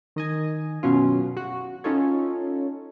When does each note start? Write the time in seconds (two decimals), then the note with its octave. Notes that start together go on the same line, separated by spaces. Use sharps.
0.16 D#3 D#5 G#5
0.83 F#2 B2 F#3 C#4 F4
1.37 F#4
1.84 C#4 D#4 F4 A4 C#5